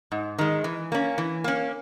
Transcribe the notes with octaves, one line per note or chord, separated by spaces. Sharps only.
G#2
D#3 G#3
E3
A#3 C#4
E3
A#3 C#4